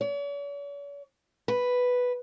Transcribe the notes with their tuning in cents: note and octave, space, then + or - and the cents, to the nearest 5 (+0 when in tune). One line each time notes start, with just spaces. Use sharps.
C#5 +45
B4 +0